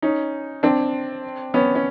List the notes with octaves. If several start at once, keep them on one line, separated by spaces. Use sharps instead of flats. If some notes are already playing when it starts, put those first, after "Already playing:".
C#4 D#4
C4 D4
B3 C#4
C#4